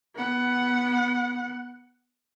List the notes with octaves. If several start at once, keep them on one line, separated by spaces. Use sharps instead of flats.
B3 F#5